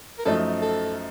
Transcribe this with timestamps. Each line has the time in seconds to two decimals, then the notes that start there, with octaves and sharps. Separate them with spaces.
0.19 A#4
0.25 F#2 F3 A3 D#4 A4
0.62 A4